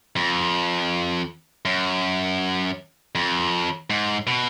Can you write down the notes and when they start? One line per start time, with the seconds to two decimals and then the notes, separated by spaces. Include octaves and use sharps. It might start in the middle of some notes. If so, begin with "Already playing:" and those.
0.16 F2
1.65 F#2
3.15 F2
3.90 G#2
4.27 B2